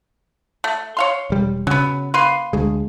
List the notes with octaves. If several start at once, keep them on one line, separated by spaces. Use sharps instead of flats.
A3
C#5 F5 C6
E1 G3
C#3 F#3 B3
A#3 B4 C6
D2 G#3